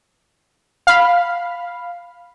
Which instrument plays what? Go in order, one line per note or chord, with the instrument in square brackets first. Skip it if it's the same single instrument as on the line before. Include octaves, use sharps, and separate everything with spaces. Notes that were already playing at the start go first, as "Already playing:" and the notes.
[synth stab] F5 B5